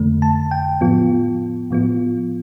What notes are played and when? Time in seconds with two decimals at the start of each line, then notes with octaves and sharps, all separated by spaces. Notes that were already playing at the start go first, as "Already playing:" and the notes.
Already playing: F2 D3 A3
0.22 A5
0.51 G5
0.81 A2 F3 B3 F4
1.71 A2 F3 B3 F4